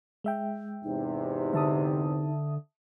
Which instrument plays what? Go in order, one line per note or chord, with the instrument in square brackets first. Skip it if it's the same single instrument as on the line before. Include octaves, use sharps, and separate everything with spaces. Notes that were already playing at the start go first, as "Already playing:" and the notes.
[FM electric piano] G#3 E5 G5
[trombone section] E2 G#2 C3 [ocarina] D#4
[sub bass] D3 [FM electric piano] E5 A5 D#6